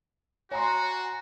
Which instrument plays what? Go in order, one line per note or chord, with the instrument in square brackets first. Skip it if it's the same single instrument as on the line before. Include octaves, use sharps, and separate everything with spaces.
[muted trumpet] F#4 [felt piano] C#5 A#5 C6 [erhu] G#5